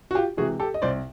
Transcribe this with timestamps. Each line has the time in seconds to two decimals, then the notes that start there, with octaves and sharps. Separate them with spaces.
0.11 F#4
0.15 F4 G4
0.37 C3 E3 G#3 F#4 G#4
0.60 G4 A4
0.74 D#5
0.82 C2 C5 D5